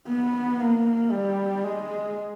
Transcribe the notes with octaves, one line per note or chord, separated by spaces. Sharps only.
B3
A#3
G3
G#3